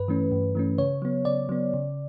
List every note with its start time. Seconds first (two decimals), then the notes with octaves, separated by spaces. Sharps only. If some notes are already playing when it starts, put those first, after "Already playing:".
Already playing: G2 B4
0.08 E3 A3 C#4
0.31 G2
0.55 E3 A3 C#4
0.78 C#3 C#5
1.02 F#3 B3
1.25 C#3 D5
1.49 F#3 B3
1.74 C#3